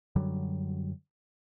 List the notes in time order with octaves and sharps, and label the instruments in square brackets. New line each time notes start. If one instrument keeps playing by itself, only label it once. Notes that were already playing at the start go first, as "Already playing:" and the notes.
[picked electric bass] F#2 D3 F#3 G3